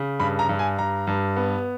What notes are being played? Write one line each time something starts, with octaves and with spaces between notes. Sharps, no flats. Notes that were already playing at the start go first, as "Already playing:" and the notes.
Already playing: C#3
G2 B5
A#5
G2
G#5
G2 A#5
G2
B3